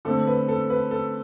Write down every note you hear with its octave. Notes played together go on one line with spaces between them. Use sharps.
D3 A3 C4 A4
B4
A4
B4
A4